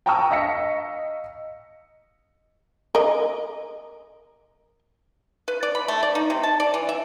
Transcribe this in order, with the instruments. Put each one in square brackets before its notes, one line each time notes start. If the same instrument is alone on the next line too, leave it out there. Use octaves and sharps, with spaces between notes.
[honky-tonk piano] G5 A5 A#5 C#6 D#6 E6
D#5 F5 A#6 B6 C#7
[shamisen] A#4 D#5
[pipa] B4
D5
B5
A3
D5
D#4
C3
A5
D5
E3
E5